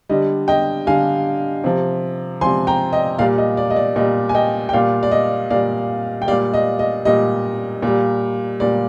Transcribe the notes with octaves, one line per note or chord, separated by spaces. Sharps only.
D3 G3 D#5
D#5 G5
D3 G3 F5 G#5
C3 F3
C3 F3 G#5 C6
G5 A#5
D#5 G5
A#2 G3 D5 F5
D#5
D5
D#5
D5
A#2 G3 D#5
G#5
D#5 G5
G5
A#2 G3 D5 F5
D5
D#5
A#2 G3 D5 F5
G5
A#2 G3 D5 F5
D#5
D#5
A#2 G3 D#5
A#2 G3
A#2 G3 D5